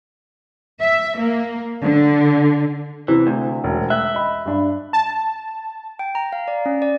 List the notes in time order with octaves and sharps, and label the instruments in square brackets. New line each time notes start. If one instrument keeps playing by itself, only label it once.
[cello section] E5
A#3
D3
[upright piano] C3 [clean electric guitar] E3
[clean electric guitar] D2
[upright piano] E1
[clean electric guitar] E5 [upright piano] F#6
[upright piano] D#5 B5
G2 D4 B5
[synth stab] A5
[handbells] G5
A#5
F5
D5
C#4
D5